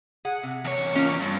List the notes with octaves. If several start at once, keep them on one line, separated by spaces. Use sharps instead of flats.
G#4 F#5
C3
E2 C#5
A#3 C#4 F4
G2 C5